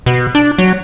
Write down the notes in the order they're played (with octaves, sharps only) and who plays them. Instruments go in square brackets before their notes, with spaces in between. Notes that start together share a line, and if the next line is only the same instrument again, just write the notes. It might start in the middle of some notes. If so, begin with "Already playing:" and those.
[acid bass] B2
D4
F#3